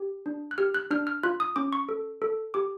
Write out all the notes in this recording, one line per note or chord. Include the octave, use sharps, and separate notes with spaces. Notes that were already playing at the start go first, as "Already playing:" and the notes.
Already playing: G4
D4
F#6
G4 F6
F#6
D4 F6
F6
F4 F#6
D#6
C#4 D6
C#6
A4
A4
G4 D6